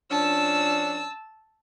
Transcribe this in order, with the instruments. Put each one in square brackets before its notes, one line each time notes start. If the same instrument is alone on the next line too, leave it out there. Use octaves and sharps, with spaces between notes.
[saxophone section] F3 C#4 D4 [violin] A5 E6